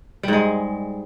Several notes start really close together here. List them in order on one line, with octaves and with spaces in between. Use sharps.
G3 G#2 G#3